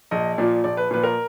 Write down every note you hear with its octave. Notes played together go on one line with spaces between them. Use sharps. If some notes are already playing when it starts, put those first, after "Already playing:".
A#1 D#5
A#2 F3 D5
A#1 D5
B4
A#2 F3 B4
A#4